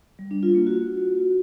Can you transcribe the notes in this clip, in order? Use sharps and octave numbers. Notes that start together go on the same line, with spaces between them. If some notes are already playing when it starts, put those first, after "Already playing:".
G3
D4
F4
A#3
F#4